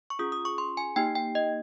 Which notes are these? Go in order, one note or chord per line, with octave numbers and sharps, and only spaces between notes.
C#6
C#4 F4 G#4 D#6
D#6
C#6
C6
G#5
A#3 D#4 G4 G5
G5
D#5